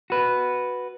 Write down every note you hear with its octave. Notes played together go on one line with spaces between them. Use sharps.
F#4 B4